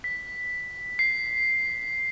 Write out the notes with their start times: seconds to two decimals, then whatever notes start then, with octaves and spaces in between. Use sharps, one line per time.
0.04 B6
0.99 C7